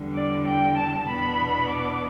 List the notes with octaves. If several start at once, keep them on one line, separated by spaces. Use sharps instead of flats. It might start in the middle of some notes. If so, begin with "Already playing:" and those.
Already playing: E2 D3 G3
D5
G5
A5
E2 B2 B3 D4 B5
D6